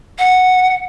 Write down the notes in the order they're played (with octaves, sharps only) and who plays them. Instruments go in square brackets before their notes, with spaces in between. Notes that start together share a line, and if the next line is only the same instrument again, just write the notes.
[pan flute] F#5